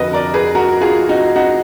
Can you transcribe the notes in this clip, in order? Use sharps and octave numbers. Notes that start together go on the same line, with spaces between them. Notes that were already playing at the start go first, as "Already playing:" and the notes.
Already playing: F1 F2 D3 F#4 A#4 B4 D#5
A#4 D5
G#4 B4
F#4 A#4
F4 G#4
D#4 F#4
D#4 F#4